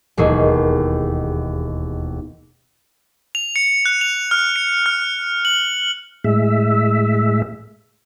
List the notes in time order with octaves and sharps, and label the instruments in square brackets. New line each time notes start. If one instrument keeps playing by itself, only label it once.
[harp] E1 D#2 G#4
[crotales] F7
C#7
F#6
F7
F6
C#7
F6
F#7
[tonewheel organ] A2 G#3 E5